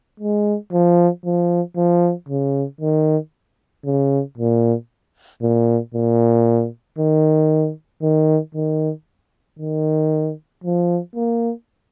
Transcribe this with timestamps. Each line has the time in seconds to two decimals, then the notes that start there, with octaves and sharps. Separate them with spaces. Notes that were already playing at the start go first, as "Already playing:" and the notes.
0.20 G#3
0.72 F3
1.25 F3
1.76 F3
2.29 C#3
2.81 D#3
3.85 C#3
4.38 A#2
5.42 A#2
5.94 A#2
6.98 D#3
8.03 D#3
8.55 D#3
9.59 D#3
10.64 F3
11.16 A#3